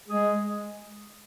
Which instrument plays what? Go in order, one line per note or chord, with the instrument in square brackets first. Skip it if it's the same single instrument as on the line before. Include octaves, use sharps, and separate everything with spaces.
[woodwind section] G#3 G#4